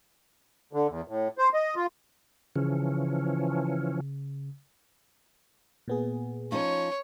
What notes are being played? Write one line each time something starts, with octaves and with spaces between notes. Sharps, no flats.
D3
E2
A2
C5
D#5
F4
C#3 E3 F3 C#4
A#2 B3 G#4
F3 C#4 D#4 C#5